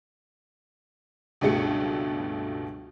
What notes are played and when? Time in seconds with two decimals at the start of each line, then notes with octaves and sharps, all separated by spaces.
1.41 C#2 G2 B2 A3 G#4 C#7